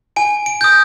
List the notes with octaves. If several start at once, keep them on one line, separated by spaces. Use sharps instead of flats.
G#5 D7
D7
D#6 G6